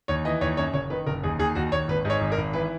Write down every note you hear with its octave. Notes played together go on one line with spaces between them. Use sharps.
D#2 C#5
E3 D#5
D#2 C#5
F#2 C#5
F#1 C#5
D#3 B4
F#1 A#4
D#2 G#4
D#2 G#4
D#2 F#4
D#2 C#5
G#1 B4
G#2 C#5
G#1
A#4
G#1
E3 B4